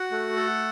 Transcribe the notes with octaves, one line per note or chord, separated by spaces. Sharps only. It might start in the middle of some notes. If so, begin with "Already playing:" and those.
Already playing: F#4 F#5
A3
A4